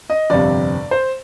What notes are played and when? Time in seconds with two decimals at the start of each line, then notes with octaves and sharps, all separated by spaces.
0.10 D#5
0.30 G1 F2 C3 G3 D5
0.91 C5